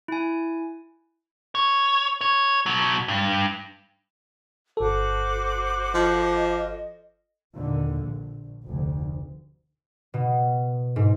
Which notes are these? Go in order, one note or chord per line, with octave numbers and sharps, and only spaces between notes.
E4 G#5
C#5
C#5
B2 F#3
G2
G1 F#4 A4 C5 D6
F3 D#5
D#2 A#2 D3
A#1
F1 D2
B2
G#2